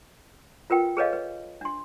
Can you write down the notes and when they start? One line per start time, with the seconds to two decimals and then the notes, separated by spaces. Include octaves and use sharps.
0.70 F4 A#4 B4 G5
0.97 G#4 A4 B4 C#5 D#5 F5
1.13 B4
1.61 D4 C6